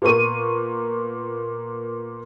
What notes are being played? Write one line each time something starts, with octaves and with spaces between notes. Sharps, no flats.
A#2 B3 A#4 C#6 D#7